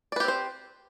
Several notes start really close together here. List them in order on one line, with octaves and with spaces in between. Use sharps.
D5 B4 G4 C4 C5